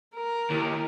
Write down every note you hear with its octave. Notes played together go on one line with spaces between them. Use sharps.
A#4
D#2 E4